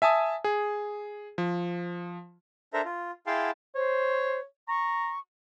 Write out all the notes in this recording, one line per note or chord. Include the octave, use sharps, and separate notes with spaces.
E5 G#5 A5 D#6
G#4
F3
D4 A4 A#4 C5 E5 A#5
F4
E4 G#4 F5 G5 A5 C6
C5 C#5
A#5 C#6